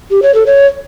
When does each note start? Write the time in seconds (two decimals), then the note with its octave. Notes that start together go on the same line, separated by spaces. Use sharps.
0.11 G4
0.23 C#5
0.34 A4
0.46 C#5